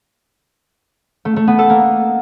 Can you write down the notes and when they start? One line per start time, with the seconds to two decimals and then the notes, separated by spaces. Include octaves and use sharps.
1.25 A3
1.36 A3
1.47 B3
1.59 A4
1.70 A#3